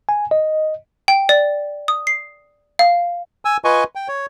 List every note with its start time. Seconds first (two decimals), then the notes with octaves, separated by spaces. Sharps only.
0.09 G#5
0.31 D#5
1.08 G5
1.29 D5
1.88 D#6
2.07 C7
2.79 F5
3.45 G#5 E6
3.65 F4 B4 D#5 G#5 C#6
3.95 G5
4.08 C#5